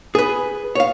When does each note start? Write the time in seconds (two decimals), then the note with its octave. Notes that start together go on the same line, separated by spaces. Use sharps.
0.15 G#4 B4
0.75 C#5 F5